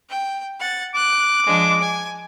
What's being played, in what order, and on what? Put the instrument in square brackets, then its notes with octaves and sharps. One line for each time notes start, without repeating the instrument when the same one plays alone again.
[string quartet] G5
F#5 A6
[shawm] D6 [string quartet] F#6
[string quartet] F3 G#3 D4
G#5